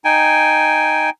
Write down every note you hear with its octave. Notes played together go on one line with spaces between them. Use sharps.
D#4 G5 G#5